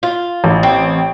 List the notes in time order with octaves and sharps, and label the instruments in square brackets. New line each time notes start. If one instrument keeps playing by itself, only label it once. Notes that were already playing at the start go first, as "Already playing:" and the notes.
[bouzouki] F4
[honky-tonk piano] A1
[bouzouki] C4